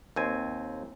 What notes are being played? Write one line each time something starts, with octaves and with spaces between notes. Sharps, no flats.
D#2 C4 G#5